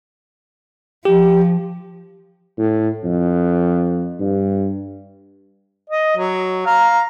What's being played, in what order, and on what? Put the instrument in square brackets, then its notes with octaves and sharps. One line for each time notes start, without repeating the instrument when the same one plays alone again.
[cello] F3 [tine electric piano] G4
[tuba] A2
F2
G2
[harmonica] D#5
F#3
F5 A#5